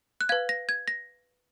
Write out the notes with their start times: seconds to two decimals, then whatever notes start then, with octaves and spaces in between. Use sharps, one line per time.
0.21 F#6
0.29 B4 F5 G#6
0.49 A#6
0.69 G#6
0.88 A#6